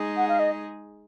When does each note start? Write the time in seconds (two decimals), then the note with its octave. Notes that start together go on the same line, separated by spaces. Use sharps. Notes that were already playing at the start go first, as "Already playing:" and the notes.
Already playing: G#3 D#4 G#4
0.17 F#5
0.28 F5
0.39 D#5